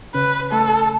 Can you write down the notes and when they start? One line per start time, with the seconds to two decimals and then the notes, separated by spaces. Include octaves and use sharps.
0.14 C#3 C#4 B4
0.52 A3 A4